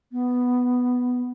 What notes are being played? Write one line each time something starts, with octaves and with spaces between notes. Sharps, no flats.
B3